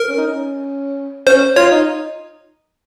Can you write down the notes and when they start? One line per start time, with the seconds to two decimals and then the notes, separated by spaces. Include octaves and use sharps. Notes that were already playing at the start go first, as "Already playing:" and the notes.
Already playing: A#4
0.09 C#4
0.18 D#4
0.27 C#4
1.27 C#4 C5
1.56 F4 C#5
1.71 D#4